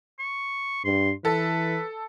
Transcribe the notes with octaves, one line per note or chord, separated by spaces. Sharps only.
C#6
G2 C6
E3 A4 B4